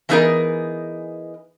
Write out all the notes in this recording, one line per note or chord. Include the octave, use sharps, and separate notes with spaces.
E3 A3 B3 D#4 G#4 A#4